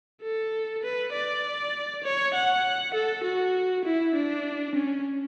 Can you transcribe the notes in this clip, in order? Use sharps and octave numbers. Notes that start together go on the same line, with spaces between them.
A4
B4
D5
C#5
F#5
A4
F#4
E4
D4
C#4